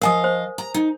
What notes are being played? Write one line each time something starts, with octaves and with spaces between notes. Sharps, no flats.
F3 A#4 D#5 F5 G#5 D#6
C5
A#5
D#4